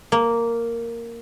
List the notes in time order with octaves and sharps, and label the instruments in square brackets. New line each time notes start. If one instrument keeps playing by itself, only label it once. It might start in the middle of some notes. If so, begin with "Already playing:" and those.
[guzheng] A#3